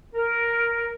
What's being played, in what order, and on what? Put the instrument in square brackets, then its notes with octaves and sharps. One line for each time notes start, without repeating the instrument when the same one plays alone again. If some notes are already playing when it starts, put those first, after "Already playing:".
[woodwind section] A#4